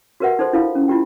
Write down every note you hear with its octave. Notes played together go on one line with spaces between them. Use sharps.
F#4 G4 A#4 B4 E5 F#5
D#4 A4 C5 C6
D4 E4 F4 A4 F5
C#4
E4 F4 G4 G5